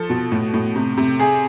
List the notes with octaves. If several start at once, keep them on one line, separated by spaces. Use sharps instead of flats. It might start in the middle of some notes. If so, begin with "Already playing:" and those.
Already playing: F3 A4
B2
A2
A2
C3
C3
G#4